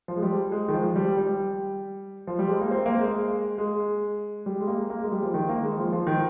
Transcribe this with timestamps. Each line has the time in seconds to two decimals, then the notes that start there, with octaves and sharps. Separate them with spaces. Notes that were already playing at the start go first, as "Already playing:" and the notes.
0.08 F3
0.16 G#3
0.22 G3
0.52 G#3
0.68 D#3
0.74 F3
0.96 G3
1.18 G3
2.27 F3
2.39 G3
2.49 G#3
2.61 A#3
2.71 C4
2.86 A#3
3.00 G#3
3.58 G#3
4.46 G3
4.60 G#3
4.68 A#3
4.90 A#3
5.02 G#3
5.12 G3
5.23 F3
5.34 D#3
5.49 A#3
5.63 G#3
5.77 F3
5.93 F3
6.07 D#3